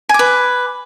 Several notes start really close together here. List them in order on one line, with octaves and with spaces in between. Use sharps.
G#5 D6 B4